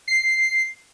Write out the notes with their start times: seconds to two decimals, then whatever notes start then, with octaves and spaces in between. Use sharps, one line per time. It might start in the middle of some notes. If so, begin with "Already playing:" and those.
0.08 C7